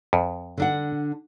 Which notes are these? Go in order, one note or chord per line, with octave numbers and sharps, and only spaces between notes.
F2
D3 D4 F#5